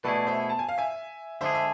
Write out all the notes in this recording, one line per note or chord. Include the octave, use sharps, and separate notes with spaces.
B2 A3 E4 G#4 B4 D5
C5 E5
A5
G#5
F5
E5 G#5
D3 G#3 D4 G#4 C5 E5
E5